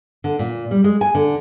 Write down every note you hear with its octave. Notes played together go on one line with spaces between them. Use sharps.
D3
A#2
G3
G#3
G#5
D3